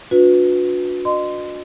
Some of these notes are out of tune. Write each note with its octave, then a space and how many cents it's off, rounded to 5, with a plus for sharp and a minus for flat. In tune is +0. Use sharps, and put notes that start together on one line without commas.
D4 -15 F#4 -40 B4 +0
D#5 -30 C6 -20